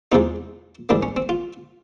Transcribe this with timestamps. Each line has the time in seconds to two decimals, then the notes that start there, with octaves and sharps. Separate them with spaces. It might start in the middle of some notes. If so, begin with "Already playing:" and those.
0.12 E2 C3 F3 G#3 D#4
0.89 G#2 E3 G3 A#3 D4
1.03 C#4
1.16 C4
1.29 F4